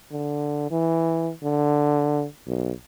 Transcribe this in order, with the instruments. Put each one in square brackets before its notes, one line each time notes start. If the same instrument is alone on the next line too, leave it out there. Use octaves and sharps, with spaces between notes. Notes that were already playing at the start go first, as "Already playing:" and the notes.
[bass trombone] D3
E3
D3
B1